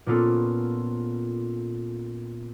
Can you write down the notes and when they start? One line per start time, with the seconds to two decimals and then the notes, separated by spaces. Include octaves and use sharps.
0.06 A#2 A#3 B3 C#4 F4 A4